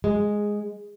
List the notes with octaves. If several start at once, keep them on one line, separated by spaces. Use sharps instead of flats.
G#3